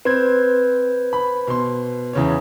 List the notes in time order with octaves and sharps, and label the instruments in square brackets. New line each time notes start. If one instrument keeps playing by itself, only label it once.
[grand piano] C4 [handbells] B4 C5 G#6
[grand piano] B5
B2 C6
E2 C#3 C#5